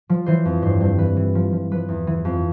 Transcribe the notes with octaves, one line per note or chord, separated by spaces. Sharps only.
F3
E3 C5
F2
G2 C5
G2 C5
E3 B4
E3
F3
F3
F3 B4
E2
E3
F2